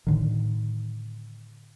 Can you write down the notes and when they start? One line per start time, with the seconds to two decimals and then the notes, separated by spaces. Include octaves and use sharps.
0.07 A2 D3 D#3